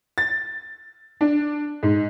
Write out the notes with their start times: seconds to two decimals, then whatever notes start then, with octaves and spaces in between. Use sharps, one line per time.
0.18 A6
1.21 D4
1.83 G#2